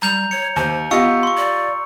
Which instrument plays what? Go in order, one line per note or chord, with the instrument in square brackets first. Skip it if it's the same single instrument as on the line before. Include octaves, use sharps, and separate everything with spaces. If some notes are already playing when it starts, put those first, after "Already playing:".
[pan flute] G3 [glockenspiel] A#5 G6 F7
[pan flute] C#5 [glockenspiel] C#7
[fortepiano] D#2 [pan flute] C5
[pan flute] B3 [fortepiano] F4 G4 D#5 [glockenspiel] C#6 E6 C#7
[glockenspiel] C6 C#6
[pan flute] D5